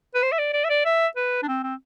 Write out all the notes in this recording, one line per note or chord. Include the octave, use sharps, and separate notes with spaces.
B4
C5
E5
D5
D5
E5
D5
E5
B4
D4
C4
C4